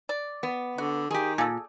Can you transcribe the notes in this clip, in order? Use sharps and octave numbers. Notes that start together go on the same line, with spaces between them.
D5
B3
D3 F#4
D#3 G4 G#4
A#2 G#4 A4